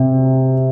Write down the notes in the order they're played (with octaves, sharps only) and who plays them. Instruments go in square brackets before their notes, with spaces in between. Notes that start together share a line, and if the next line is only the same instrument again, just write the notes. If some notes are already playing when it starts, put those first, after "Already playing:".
Already playing: [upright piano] C3